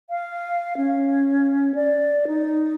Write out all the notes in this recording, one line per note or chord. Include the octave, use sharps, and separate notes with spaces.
F5
C#4
D5
D#4